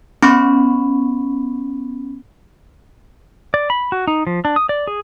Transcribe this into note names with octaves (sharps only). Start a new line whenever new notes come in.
B3 C#4 B5 C#6
D5
B5
F#4
D#4
F3
D4
D#6
D5
G#4